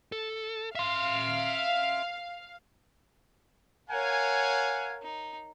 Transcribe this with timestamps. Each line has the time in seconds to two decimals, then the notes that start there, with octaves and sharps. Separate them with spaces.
0.12 A4
0.75 E5 F5 C6
3.90 A#4 C#5 F5 F#5 G#5
5.02 D#4